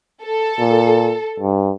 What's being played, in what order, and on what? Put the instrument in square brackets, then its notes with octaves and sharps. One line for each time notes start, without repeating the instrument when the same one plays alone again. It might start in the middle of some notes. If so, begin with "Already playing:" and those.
[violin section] A4
[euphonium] A#2
G2